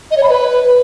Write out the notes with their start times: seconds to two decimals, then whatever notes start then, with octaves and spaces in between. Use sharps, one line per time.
0.11 D#5
0.17 C#5
0.23 B5
0.29 B4